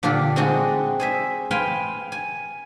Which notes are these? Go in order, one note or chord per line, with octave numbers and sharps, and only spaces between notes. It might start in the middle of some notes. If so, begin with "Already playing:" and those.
A#2 D3 D4 F4 G4
G#3 C4 D4 D#4 F#4
G#4 C5 E5
B4 F5 G5 G#5 C6
G#5